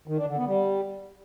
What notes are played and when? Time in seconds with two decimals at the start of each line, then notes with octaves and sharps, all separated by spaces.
0.08 D#3
0.17 D4
0.27 D3
0.37 B3
0.47 G3